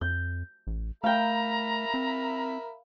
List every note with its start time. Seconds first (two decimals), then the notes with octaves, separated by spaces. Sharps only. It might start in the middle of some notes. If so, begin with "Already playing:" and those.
0.01 F2 G6
0.67 A1
1.04 A3 A#4 E5 F5 G5 A#5 B5
1.94 C4